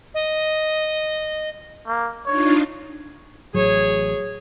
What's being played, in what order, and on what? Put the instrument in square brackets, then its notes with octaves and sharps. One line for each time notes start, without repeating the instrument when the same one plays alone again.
[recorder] D#5
[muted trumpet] A#3
[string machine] D4 D#4 F4 [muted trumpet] C#5
[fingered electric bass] A1 F#3 [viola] G#4 C#5